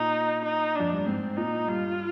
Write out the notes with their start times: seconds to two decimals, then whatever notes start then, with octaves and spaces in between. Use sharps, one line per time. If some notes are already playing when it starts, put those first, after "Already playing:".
Already playing: A#2 D#4
0.45 D#4
0.75 F2 D4
0.93 G2
1.06 G#2 C4
1.37 A#2 D#4
1.68 G2 F4